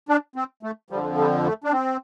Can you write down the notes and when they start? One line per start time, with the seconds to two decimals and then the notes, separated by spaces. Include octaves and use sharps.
0.09 D4
0.36 C4
0.63 A3
0.90 F2 D3 F3 G3
1.18 G3
1.45 A3
1.64 D4
1.72 C4